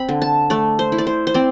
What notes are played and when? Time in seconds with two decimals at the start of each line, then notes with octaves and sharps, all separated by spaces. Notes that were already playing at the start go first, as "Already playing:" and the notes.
Already playing: C4 B5
0.09 D3
0.22 A5
0.50 A3 D5
0.79 C5
0.92 E4
0.98 D5
1.07 C5
1.27 C5
1.34 C4 D5